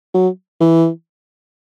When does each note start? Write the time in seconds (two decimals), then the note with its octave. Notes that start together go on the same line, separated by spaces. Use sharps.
0.14 F#3
0.61 E3